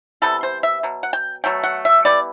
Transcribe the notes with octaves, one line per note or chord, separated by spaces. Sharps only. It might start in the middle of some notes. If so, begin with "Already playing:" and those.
C3 E3 G3 B3 A4
C5
E5
B2 F#3
F#5
G5
B2 F#3 A3 G5
F#5
E5
E3 G3 B3 D5